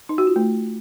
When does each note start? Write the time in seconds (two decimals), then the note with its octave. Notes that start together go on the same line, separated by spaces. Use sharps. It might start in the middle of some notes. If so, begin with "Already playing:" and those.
0.09 D#4
0.18 F#4
0.27 F4
0.36 A3